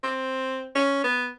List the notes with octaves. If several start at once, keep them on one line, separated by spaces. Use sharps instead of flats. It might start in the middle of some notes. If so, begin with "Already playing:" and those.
C4
C#4
B3